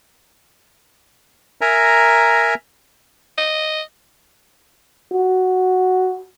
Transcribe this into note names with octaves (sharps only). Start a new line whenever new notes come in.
A#4 E5 G#5 A#5
D#5
F#4